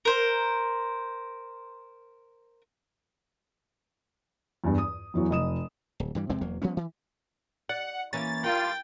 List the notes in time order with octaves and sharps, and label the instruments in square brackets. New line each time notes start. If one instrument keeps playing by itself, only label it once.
[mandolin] A#4 C5
[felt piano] E2 G2
D#6
E2 E3 F#3
F1 D#5 D#6 E7
[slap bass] D1
G2 E3 G3
E2 C3 G#3 C4
E1 E2 F#3 A#3
F3 G3 B3 C#4
E3
[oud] D5 [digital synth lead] F#5
[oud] E3 A#3 C#4 [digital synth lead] A6
[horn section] G2 F4 [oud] A#4 [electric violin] G5